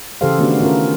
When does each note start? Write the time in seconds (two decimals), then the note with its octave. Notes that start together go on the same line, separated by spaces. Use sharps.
0.21 C#3 E3 G4 A4 C5 F5
0.39 D#3 A3 B3 D4 F#4 B4
0.61 C#4 F4 A#4